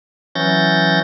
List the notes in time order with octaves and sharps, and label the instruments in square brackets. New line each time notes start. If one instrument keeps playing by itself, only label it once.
[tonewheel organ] E3 F#3 C#4 G6 A6 A#6